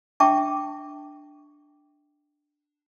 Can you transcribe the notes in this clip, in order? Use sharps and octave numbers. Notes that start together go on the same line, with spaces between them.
D4 E5 G5 A5 C#6 D6